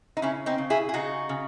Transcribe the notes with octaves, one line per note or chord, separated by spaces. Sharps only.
D#4
C#3 C#4 E4
C4 D#4
C#3
E4 G#4
G#4
C#3 D#4 F#4
C#3